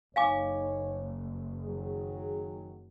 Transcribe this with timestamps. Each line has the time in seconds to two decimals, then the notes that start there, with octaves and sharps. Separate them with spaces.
0.16 F#1 D#4 C#5 F5 G#5 D6
1.64 D#3 F#3 G#4